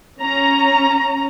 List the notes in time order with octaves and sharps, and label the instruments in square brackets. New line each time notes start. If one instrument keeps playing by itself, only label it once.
[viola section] C#4 A#5